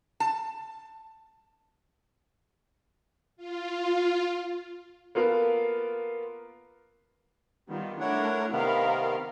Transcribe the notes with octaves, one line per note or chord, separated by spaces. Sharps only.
A5
F4
A#3 B3 F4 A4 A#4
D#3 G3 B3 F4
A3 D4 E4 A#4 C#5 F#5
C3 D#3 B3 A#4 F5 B5